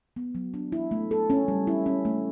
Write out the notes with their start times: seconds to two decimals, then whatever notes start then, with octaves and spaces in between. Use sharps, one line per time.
0.16 B3
0.35 F#3
0.54 D4
0.72 E4
0.91 A3
1.11 A4
1.30 C#4
1.48 G3
1.67 E4
1.86 C#4
2.05 A3